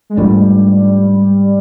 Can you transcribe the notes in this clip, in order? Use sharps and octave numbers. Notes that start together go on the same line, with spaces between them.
G#3
G#2 F3 G3 A3 D4